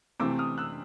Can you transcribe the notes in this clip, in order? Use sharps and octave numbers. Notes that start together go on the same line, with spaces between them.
C3 E3 A3 C4 D6 E6
D#6 F6
E6 F#6